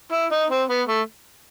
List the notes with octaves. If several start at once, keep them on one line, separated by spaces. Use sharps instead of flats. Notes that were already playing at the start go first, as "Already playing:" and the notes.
E4
D#4
C4
B3
A3